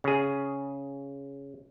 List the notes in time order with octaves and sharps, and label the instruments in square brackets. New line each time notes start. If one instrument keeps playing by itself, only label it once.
[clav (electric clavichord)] C#3 G#4